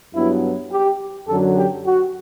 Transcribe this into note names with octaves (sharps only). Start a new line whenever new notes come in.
G2 F#3 B3 E4
G4
F#2 D3 F#3 A4
G4
F#4